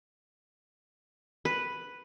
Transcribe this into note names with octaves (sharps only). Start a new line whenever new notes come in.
B4